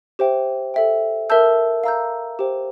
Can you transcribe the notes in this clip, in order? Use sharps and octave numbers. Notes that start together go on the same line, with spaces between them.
G4 C5 E5 G5
A4 E5 G5
A#4 E5 A5 E6 G6
F5 A#5 E6 G6
G4 C5 G5